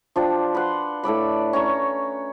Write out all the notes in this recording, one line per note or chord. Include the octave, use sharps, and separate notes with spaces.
F3 D4 F4 G4
B4 F#5 C6
A2 A4 D5 B5
C#4 A#5 C#6